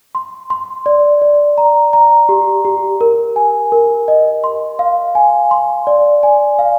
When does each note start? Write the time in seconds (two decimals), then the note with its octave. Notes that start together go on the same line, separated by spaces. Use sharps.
0.15 C6
0.50 C6
0.86 D5
1.22 D5
1.58 A#5
1.93 A#5
2.29 G4
2.65 G4
3.01 A#4
3.36 G#5
3.72 A#4
4.08 D#5
4.44 C6
4.79 F5
5.15 G#5
5.51 C6
5.87 D5
6.23 G#5
6.59 F5